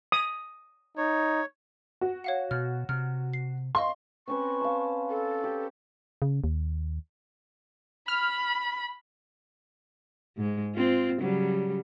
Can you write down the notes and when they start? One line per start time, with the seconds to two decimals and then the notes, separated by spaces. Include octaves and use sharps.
0.12 D#6
0.97 D#4 C#5
2.01 F#4
2.24 C#5 F5 F#5
2.51 B2 F6
2.89 C3 F6
3.33 C7
3.75 D#5 F5 C6 C#6
4.28 C4 C#4 B4 C#6
4.61 F5 A5
5.10 A4
5.44 G4
6.22 C#3
6.44 D#2
8.08 B5 F6
10.37 G#2 G#3
10.75 C4 F4
11.20 C#3 F#3 G3